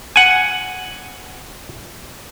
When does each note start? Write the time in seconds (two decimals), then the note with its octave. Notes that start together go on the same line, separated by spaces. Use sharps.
0.16 F#5 G#5